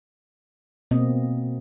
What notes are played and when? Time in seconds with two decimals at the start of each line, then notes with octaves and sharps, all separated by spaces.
0.91 B2 A#3 C4 D#5